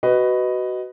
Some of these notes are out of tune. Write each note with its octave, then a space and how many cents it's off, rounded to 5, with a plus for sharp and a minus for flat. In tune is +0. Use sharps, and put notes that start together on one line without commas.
F#4 +20 B4 +10 D#5 +0